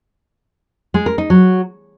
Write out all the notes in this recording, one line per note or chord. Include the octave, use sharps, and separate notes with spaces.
G#3
A#4
D#4
F#3